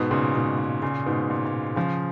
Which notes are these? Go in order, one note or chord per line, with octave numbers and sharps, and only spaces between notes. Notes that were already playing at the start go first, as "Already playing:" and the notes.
Already playing: G#2 B2
A#2 C#3
G#2 B2
A#2
A#2 C#3
G#2 B2
A#2
A#2
C#3 F3